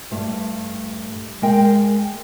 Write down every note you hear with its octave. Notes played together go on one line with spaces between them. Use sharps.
G2 A3
G#3 A#4 G5